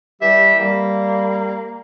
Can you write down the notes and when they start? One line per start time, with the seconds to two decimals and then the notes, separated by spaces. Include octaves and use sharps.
0.22 E3 G3 G4 E5
0.59 G3 A#3